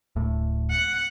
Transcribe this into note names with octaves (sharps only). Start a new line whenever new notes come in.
D1 A2
F#5